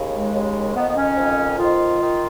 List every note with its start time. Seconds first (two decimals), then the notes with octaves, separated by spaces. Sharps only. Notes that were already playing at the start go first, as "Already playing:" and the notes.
Already playing: D#2 C#3
0.12 G#3
0.33 D#2 C#3
0.75 F2 D#3 B3
0.88 B3
0.96 C#4
1.17 F2 D#3
1.59 F2 D#3 F4
2.01 D#3